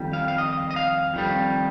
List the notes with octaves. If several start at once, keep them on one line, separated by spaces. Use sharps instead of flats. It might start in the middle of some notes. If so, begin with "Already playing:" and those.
Already playing: F2 D#3 G3
F5
F5
D#5
D#5
F5
F2 D#3 G3